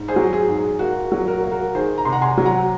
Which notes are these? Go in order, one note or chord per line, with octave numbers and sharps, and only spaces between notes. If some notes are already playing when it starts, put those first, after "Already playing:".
Already playing: G#2
G#4 C5
F#3
G#4
G#2
G#4
A#3 F#4
F#4
F#3
F#4 A#4
A#3
F#4 A#4
D#3 G#4 C5
A#5
C3 C6
F#5 A#5
G#5 C6
F#3
F#5 A#5